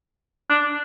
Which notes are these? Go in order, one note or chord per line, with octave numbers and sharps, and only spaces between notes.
D4